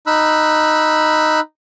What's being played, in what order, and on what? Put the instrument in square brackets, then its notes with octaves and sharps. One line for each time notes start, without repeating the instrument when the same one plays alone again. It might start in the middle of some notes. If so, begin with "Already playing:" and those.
[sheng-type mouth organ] D#4 B5 E6 F#6